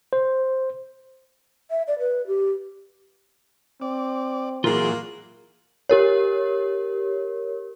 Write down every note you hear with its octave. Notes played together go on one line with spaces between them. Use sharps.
C5
E5
D5
B4
G4
C4 D5
A#2 E3 F#3 A#3 F4 G#4 A#4
G4 A#4 C#5